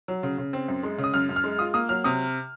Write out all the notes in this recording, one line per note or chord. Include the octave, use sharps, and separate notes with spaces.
F#3
C#3
C#3
C4
F#2
G#3
C#3
D#6
F#2 F6
F#2
F6
G#3
F4 D#6
A#3 D#6
F#3 F6
C3 D#6